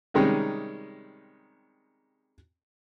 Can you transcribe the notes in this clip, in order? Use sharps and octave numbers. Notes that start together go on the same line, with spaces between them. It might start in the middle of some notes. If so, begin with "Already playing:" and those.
C3 D#3 G3 G#3 C#4 D#4